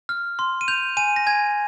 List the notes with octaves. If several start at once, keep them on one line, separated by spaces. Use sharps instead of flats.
F6
C6
D#7
G6 F7
G#5 D#7
A#6
G#5 G#6